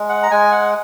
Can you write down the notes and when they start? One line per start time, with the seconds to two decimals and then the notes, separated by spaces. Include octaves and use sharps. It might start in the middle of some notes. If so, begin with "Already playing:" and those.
Already playing: G#3
0.09 F#5
0.23 A#5
0.31 G#3 G#5
0.52 F#5